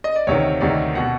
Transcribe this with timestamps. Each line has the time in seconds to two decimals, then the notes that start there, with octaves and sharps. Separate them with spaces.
0.04 D#5
0.16 D5
0.27 D2 C3 D#3 C#5
0.61 D2 C3 D#3 D5
0.95 B2 F#5